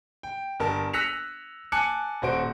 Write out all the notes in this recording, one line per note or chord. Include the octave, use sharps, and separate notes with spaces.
G5
G1 A#4 A5
E6 F#6 A#6 B6 C#7 F7
G#5 A5 D6 F#6 C#7
D#1 F#4 C5 D7